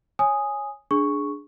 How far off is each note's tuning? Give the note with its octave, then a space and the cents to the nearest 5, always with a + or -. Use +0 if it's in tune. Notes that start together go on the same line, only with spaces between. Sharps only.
C#5 +0 G#5 -5 D#6 +0
D4 +0 G#4 +0 C#6 +0